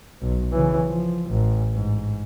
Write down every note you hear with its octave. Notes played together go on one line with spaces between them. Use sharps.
B1
C#3 E3
F3
A1
G#2